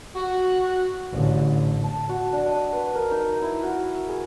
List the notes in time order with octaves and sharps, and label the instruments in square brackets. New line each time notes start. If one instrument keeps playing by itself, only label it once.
[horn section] F#4
[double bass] A1 D3
[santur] A5
F#4
D4
D#5
B4
A#4
D#4
E4
F#4
G#4